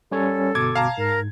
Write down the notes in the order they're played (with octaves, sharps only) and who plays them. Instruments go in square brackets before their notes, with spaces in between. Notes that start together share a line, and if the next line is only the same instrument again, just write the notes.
[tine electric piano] G3 C#4 C#5 [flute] A4
[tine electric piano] G1 B2 D6 [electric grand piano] G#6
[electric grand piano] F5 A5 A#5
[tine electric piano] G#2 [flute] A#4